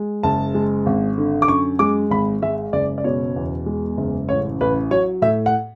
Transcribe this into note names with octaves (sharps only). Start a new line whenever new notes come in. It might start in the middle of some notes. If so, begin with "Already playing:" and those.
Already playing: G#3
F#1 A5
G#3
G#1
D3
D6
F#2 C#6
G#3 D6
G#1 B5
G#3 E5
F#1 D5
D5
B2 C#5
E2
G#3
F#1
A1 C#5
A1 B4
F#3 C#5
A2 E5
F#5